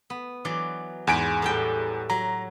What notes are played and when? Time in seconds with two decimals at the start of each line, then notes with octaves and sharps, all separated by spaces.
0.10 B3
0.45 E3 F#3 D5
1.07 E2 G#2 B4 G#5 D7
1.42 A2 G3 G5
2.10 F#3 A#5